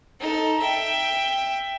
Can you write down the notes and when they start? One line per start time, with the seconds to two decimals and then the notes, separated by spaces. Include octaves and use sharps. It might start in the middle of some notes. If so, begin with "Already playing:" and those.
0.20 D#4 A4
0.59 E5 G5